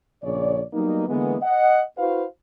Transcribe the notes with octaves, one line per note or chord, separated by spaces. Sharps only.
A#1 C#3 C#5 D5
F#3 G3 A#3 B3 D#4
D3 E3 G#3 A#3 B3
D#5 F#5
E4 F#4 B4 C5 F5